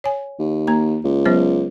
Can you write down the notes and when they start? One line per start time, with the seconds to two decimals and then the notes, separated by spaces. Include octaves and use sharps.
0.04 C#5 G#5
0.39 D#2
0.67 A#3 A#5
1.04 C#2
1.25 F#3 B3 C5